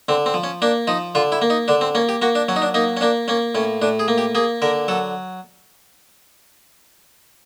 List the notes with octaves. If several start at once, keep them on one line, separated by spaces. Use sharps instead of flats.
D3 C4
C4
F3
C#4
A#3 D4
F3 D#4
D3 F4
E4
A#3
D#4
D3 D4
C4
A#3 C#4
G4
A#3 F#4
D4
F#3 C#4
D#4
D4
A#3 D#4
C#4
A#3 D4
A#3 C#4
A2 C#4
A2 D4
G#4
A#3
G4
A#3 G#4
D3 A#4
F#3 A4